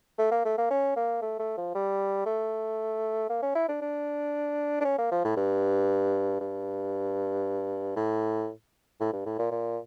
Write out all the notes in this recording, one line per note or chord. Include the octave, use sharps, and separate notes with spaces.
A3
A#3
A3
A#3
C#4
A#3
A3
A3
F3
G3
A3
A#3
C#4
E4
D4
D4
D4
C#4
A#3
F3
A2
G2
G2
A2
A2
G2
A2
A#2
A#2